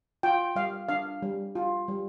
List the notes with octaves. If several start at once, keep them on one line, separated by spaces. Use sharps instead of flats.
F4 G5
G3 F5
D4 F5
G3
F4
G3